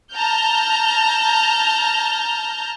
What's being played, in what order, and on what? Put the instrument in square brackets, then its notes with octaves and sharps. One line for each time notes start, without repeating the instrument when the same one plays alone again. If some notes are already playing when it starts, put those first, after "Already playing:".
[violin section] A5 A#5 F6 G6